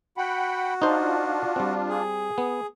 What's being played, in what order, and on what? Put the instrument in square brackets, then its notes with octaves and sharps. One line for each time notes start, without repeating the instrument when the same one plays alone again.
[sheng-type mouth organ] F#4 [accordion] F#5 G5 B5
[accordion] D4 F4 [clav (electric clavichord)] D#4 C5
[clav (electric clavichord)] G3 C4
[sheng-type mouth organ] G#4
[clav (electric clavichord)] B3